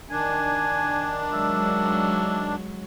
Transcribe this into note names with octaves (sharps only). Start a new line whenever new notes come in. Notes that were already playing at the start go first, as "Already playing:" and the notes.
D#3 D4 G#5
F#3 G#3 E5